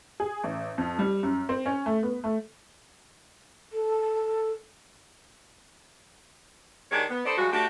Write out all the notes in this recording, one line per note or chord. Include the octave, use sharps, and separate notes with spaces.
G#4
A1
F2
G3
F#2
C4
C#4
A3
B3
A3
A4
D#3 G#3 D4 G4 A#4 C#5
B3
D#4 A4 B4 C5 D5
F3 G3 G#3 F#4
A3 D4 F#4 G4